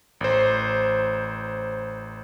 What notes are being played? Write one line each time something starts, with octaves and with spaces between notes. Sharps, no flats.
A1 C5